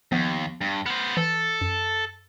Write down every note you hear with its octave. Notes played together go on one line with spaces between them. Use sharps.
D#2 F3 B3
G2
B3 C5 F6
E3 A4
F#2